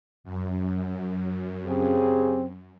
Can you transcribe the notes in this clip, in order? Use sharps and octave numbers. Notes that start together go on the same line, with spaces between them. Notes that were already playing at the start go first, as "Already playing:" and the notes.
F#2
C#3 C4 G4 G#4